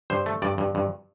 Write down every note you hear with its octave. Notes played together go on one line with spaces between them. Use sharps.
G2 C5
A3
G2 D5
G2
G2